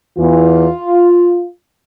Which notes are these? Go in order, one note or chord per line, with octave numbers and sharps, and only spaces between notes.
E2 E3 F4